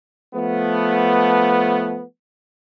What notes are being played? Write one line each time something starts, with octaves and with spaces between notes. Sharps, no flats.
F3 A3 B3